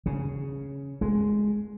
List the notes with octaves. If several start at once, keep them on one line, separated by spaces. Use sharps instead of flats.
C#3
G#3